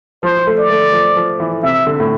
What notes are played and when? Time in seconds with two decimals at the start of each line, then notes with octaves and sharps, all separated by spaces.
0.23 F3 C5
0.47 A3
0.58 D5
0.70 A3
0.93 F3
1.17 F3
1.40 E3
1.63 C3 E5
1.87 D3
2.00 A2